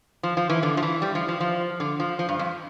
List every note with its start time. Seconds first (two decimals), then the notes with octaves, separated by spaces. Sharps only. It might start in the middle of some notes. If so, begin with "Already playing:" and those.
0.23 F3
0.37 F3
0.49 E3
0.63 D3
0.77 F3
0.83 E3
1.02 G3
1.15 F3
1.28 F3
1.40 F3
1.80 D3
2.00 F3
2.19 F3
2.29 G2
2.39 F2